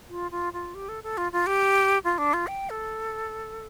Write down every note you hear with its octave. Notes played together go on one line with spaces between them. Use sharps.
F4
F4
F4
G4
A4
A4
F4
F4
G4
F4
D4
F4
G5
A4